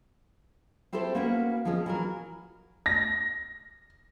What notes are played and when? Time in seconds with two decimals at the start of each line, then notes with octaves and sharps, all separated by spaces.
0.93 C4 E4 G4 A4 C5
1.15 A#3 B3 C#4 F#4 A#4 B4
1.65 C#3 F3 G3 G#3 B3 C#4
1.86 E3 F#3 A#4
2.86 A#6